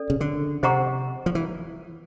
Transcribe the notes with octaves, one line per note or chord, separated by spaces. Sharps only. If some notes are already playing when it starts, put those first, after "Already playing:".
Already playing: C#4 A4 D5
C#3
D3
C3 C5 D#5 F#5 A#5 C#6
F3
E3